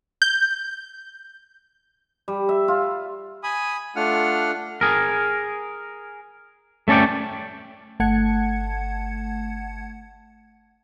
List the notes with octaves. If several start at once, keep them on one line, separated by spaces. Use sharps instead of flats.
G6
G3
E5
F4
G#5 B5 D#6
A3 D4 F4 F#5 F6
G#4 A#4
A3 C#4 A4 D5 G5
G1 A3 F#5 A5 G#6 C#7